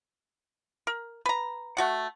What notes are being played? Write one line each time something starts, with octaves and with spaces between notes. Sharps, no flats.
A#4
B4 A#5
A3 F#4 F#5